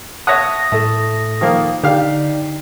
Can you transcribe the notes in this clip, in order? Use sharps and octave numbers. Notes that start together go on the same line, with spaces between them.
C#5 E5 F#5 A5 D#6 A#6
A2 A3 A4
D#3 F3 A#3
D3 D#4 G4 D5 F5